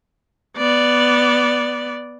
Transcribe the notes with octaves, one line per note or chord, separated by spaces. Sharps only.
B3 D5